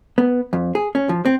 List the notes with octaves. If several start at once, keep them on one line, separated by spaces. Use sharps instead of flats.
B3
F2
G#4
C#4
F3
C4